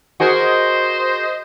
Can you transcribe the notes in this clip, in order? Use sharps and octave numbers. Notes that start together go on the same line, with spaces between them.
F#4 G#4 A#4 C5 D#5